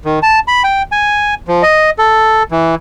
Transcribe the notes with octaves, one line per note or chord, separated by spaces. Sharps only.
D#3
A5
B5
G5
G#5
F3
D#5
A4
E3